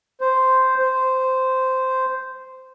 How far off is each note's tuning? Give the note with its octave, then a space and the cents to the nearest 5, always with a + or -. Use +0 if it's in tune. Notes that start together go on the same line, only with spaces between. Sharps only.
C5 -5
C5 -10